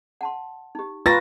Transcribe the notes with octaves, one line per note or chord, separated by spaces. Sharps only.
F#5 A5 C6
D#4 G4
F4 B4 G5 A#5 C#6 A6 A#6